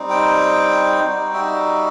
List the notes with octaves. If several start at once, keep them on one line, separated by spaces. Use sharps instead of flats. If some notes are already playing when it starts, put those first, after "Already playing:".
Already playing: G3 C4 D#4
G5
G3 D#4 F#4
E5